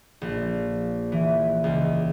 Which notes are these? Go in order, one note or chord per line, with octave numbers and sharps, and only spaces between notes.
A#1
E3
C#2